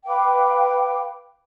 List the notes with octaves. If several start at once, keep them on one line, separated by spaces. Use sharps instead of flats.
B4 F5 G5 D6